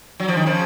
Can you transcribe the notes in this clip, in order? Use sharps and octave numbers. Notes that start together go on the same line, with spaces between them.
F#3
F3
D#3
C#3 F3